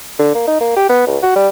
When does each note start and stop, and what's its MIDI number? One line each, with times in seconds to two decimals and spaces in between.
0.19 0.32 50
0.35 0.43 58
0.48 0.59 63
0.61 0.76 58
0.77 0.87 67
0.89 1.03 59
1.07 1.18 37
1.23 1.34 66
1.36 1.49 55